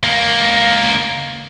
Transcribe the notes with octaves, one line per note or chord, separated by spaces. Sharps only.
C#2 A#3